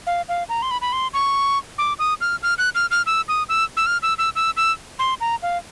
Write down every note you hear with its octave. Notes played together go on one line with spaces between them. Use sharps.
F5
F5
A#5
C6
B5
B5
C6
C#6
D6
D#6
F6
F6
F#6
F6
F6
E6
D#6
E6
E6
F6
E6
E6
E6
E6
C6
A#5
F5